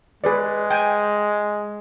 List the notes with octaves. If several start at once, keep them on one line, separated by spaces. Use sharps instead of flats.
G#3 G#4 B4 D5
G5 G#5